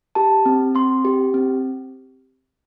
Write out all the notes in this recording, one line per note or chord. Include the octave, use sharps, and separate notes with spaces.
G4 A5
C4
C4 C6
G4
C4